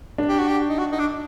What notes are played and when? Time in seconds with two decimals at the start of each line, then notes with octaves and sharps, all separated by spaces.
0.18 D4
0.29 G4
0.38 F#4
0.48 G4
0.69 D#4
0.79 F#4
0.92 D#4
0.99 D4